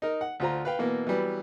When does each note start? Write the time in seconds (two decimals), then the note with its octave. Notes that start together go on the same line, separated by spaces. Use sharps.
0.02 D#4 A#4
0.21 F#5
0.40 D2 F4 C5 A#5
0.65 B4 F5 G5
0.79 B2 E3 A#3
1.07 E3 F#3 G3 B3